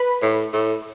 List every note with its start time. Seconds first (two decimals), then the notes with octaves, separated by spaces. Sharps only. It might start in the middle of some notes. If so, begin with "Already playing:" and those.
Already playing: B4 B5
0.22 A2
0.53 A2